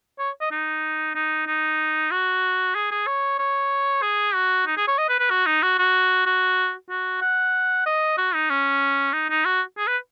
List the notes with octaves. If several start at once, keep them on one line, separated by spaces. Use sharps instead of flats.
C#5
D#5
D#4
D#4
D#4
F#4
G#4
G#4
C#5
C#5
G#4
F#4
D#4
G#4
C#5
D#5
B4
B4
F#4
D#4
F#4
F#4
F#4
F#4
F#5
D#5
F#4
D#4
C#4
D#4
D#4
F#4
G#4
B4